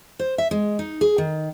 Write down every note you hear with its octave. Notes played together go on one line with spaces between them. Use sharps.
C5
E5
G#3
D#4
G#4
D#3